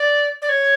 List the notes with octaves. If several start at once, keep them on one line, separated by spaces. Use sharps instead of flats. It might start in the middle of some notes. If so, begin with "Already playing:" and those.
Already playing: D5
D5
C#5